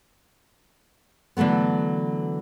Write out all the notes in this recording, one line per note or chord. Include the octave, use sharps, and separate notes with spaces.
D3 E3 F#3 A3 B3